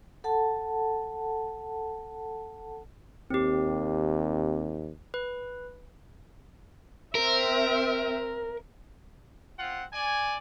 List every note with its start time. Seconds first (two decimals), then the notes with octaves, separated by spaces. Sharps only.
0.24 A4 F#5 A5
3.30 D#2 C4 G4
5.14 B4
7.15 C4 A#4 E5
9.59 C4 F4 F#5
9.93 D5 G#5